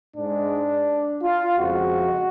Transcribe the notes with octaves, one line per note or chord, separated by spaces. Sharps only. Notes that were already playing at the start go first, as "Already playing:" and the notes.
G#2 G#3 D4
F4
F2 C#3 F3 G#3 F#4